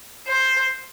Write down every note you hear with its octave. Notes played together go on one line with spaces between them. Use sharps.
C5